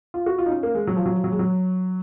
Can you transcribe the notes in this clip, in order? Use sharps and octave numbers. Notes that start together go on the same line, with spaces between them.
F4
F#4
F4
D#4
C#4
A#3
G#3
F#3
F3
F#3
F3
F#3
G#3
F#3